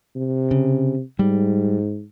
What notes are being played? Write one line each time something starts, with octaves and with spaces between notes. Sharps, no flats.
C3
C#3
G#2 G3